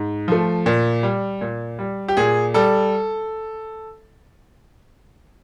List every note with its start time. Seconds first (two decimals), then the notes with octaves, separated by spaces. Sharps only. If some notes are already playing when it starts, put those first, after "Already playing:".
Already playing: G#2
0.28 F3 A3
0.66 A#2
1.03 G3
1.41 A#2
1.79 G3
2.08 G4
2.17 A#2 G#4
2.54 G3 A4